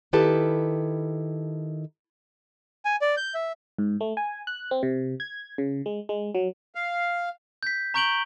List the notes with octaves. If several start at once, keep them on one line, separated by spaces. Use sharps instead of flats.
D#3 E4 G4 A4 B4 A5
G#5
D5
G6
E5
G#2
A3
G#5
F#6
C4
C3
G#6
C#3
G#3
G#3
F#3
F5
G6 B6
A#5 C#6 G6 D7 F#7 G7